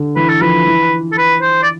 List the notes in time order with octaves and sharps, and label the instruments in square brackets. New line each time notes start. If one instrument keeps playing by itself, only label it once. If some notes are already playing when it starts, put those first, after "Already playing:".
Already playing: [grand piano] D3
[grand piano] E3 [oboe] B4
[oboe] A4
[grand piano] F3 [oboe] B4
[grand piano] E3
[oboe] A4
B4
C5
D5